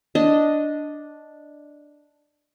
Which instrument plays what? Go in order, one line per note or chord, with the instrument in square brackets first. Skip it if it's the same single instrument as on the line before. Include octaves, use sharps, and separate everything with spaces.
[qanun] D4 D#5